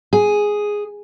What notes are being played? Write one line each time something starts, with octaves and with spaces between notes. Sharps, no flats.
G#4